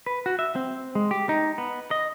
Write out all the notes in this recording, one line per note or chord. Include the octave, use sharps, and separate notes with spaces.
B4
F#4
E5
C4
G#3
G4
D#4
B3
D#5